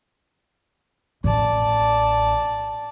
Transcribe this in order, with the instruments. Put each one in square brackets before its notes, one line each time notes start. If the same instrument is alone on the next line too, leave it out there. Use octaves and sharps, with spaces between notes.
[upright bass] A1 [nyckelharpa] D5 A5